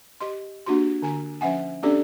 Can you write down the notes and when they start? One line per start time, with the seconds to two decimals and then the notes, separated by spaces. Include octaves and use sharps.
0.20 G4 D#5 C6
0.66 A#3 D4 F#4 G4 C6
1.02 D3 G#5 A#5
1.41 F3 C#4 E5 F#5 G#5
1.83 B3 C#4 D4 G4 A4 D5